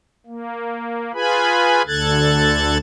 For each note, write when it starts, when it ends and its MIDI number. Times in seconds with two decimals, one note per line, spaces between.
0.26 1.12 58
1.14 1.82 65
1.14 1.82 68
1.14 1.82 71
1.14 1.82 80
1.14 1.82 83
1.87 2.77 38
1.87 2.77 50
1.87 2.77 69
1.87 2.77 90
1.87 2.77 92
1.87 2.77 93